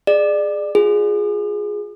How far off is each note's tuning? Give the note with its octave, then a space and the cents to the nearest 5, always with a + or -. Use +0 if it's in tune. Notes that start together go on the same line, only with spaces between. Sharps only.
G#4 +0 D5 +20
F4 +25 G#4 +0